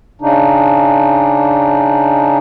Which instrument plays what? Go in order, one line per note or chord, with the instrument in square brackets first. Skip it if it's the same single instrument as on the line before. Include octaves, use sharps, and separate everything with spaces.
[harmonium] C#3 D4 D#4